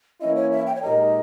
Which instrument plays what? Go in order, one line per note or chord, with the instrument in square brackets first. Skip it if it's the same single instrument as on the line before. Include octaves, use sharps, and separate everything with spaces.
[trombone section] E3 A#3 C#4 E4 [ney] D#5
[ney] C#5
E5
G5
C#5
[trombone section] A#2 G#3 D#4 G4 A#4 [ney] D#5